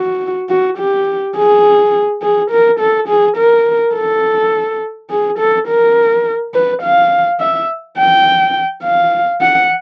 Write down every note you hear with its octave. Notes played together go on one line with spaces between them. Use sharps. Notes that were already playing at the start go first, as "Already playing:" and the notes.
Already playing: F#4
F#4
G4
G#4
G#4
A#4
A4
G#4
A#4
A4
G#4
A4
A#4
B4
F5
E5
G5
F5
F#5